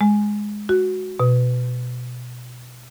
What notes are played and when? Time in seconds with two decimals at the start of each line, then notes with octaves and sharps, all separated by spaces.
0.01 G#3
0.69 F#4
1.20 B2